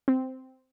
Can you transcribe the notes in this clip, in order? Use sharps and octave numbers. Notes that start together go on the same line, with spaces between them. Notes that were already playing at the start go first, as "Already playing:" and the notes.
C4